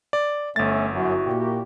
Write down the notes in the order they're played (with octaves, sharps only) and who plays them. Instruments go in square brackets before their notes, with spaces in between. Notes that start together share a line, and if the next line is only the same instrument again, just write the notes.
[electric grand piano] D5
[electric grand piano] G1 A6 [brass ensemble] A3 C#4 E5
[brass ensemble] F#2 [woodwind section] E4 F#4
[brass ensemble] A#2 G4